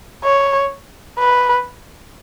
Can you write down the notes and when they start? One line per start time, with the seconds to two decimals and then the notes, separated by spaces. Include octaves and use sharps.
0.24 C#5
1.19 B4